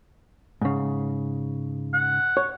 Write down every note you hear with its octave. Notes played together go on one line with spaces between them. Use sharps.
G#2 C#3
F#5
C#5